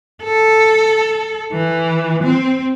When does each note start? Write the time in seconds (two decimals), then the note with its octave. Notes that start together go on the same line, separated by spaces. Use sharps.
0.23 A4
1.52 E3
2.23 C4